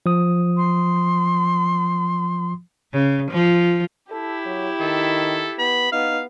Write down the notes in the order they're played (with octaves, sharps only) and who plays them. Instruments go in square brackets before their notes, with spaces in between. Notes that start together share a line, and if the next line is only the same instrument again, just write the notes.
[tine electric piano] F3 D#6
[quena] C6
[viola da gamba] C#3
F3
[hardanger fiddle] E4 G4 [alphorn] A4
[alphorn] F#3
[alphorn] D#3 [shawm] A4
[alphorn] B3 [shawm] B5
[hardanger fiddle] B3 [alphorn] D#4 [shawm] F5